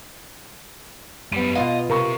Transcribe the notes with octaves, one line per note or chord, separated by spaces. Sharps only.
F#2 G3 B3 D#7
B2 F4 D#5 F5
C3 A#4 A#5 C#6